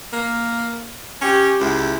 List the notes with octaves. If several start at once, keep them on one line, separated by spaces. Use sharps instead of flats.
A#3
C#4 G4
C#2 E4